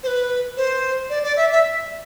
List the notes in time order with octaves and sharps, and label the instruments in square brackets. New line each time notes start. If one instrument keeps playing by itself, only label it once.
[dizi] C5
B4
C5
D5
D5
E5
E5